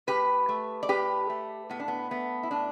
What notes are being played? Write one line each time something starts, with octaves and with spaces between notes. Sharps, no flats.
A2 G4 B4
A3
D5
A2 G4 B4
A3
A2 B3
D4
B3
A3 B3
E4
A2 D4